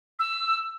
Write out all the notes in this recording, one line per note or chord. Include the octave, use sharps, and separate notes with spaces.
E6